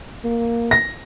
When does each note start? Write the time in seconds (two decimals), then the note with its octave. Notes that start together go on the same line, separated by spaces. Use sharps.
0.24 A#3
0.71 A#6